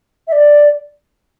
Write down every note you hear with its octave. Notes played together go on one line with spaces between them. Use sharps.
E5
D5